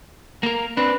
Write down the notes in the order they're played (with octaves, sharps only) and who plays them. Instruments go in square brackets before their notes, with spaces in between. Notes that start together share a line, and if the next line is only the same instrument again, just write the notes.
[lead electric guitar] A#3 A#4
[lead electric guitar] C4 D4 [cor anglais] B4